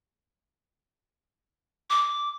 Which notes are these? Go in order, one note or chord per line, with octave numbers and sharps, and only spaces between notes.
D6